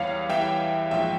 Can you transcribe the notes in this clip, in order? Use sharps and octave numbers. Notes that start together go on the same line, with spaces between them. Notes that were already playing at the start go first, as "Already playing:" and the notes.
Already playing: E2 E3 G3 C#5 F5
E2 E3 G3 E5 G5
A#1 G#2 F3 E5 G5